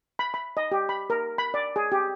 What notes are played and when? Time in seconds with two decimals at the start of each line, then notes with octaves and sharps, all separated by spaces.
0.19 B5
0.34 B5
0.57 D#5
0.72 G4
0.89 B5
1.10 A#4
1.38 B5
1.54 D5
1.76 G#4
1.92 G4